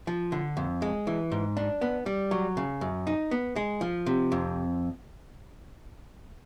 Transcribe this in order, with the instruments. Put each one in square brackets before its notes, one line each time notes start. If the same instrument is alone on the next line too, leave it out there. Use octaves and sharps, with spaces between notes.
[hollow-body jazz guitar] F3
D3
F2
G#3
E3
G#2
D4
B3
G3
F#3
C#3
F#2
D#4
B3
G#3
F3
C3
F2